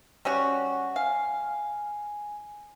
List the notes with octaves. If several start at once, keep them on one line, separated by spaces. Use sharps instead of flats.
G3 C#4 F#4
F5 G#5